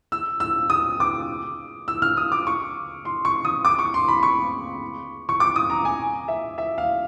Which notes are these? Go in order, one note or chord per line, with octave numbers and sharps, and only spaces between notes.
E6
E6
D#6
D6
E6
F6
D#6
D6
C#6
C6
C#6
D#6
D6
C#6
C6
B5
C#6
C#6
D6
D#6
A#5
G#5
E5
E5
F5